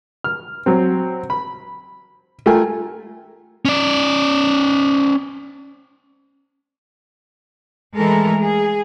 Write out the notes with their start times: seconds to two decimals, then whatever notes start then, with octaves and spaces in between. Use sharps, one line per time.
0.24 F6
0.66 F#3 C4
1.30 B5
2.46 A3 F4 A#4 G5 G#5
3.65 C#4 D5
7.97 E3 G#3 A3 A4 A#4
8.42 G#4